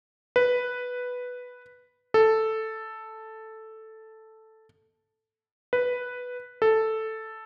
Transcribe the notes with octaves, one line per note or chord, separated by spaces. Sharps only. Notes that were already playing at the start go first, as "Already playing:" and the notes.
B4
A4
B4
A4